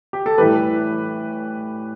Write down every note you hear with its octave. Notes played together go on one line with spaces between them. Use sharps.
G4
A4
A2 E3 G3 G4 B4